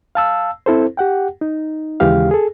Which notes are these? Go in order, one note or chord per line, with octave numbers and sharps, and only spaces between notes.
F5 A5 E6
C4 E4 A4 C5
G4 F#5 G5
D#4
D#2 C#3 E3 G#3 G4 F5
G#4 A4